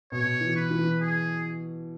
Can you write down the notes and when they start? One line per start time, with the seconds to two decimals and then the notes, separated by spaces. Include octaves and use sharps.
0.12 B2 C#5
0.41 E3
0.56 B4
0.71 E3
1.01 G#4